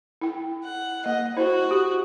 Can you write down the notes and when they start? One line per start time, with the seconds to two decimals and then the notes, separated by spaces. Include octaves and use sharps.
0.22 E4 G5
0.64 F#5
1.06 A#3 D#5
1.37 E4 F#4 C5
1.71 G4